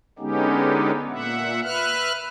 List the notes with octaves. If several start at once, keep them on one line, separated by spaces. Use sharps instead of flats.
D3 G#3 B3 C#4 D#4 G4
A#2 E5 F#5
B4 E5 F6 F#6